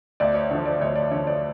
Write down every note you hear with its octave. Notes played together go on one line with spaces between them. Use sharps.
D2 D5
C#5
D3 F3 C#5
D5
D2 C#5 D#5
D5
D3 F3 C#5
D5